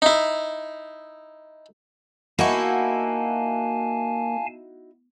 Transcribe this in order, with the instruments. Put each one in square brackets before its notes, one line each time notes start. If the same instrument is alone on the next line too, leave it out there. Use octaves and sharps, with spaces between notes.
[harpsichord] D#4 E4
[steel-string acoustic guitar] A#3 [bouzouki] D#4 E4 F#4 [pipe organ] F5 G#5 A5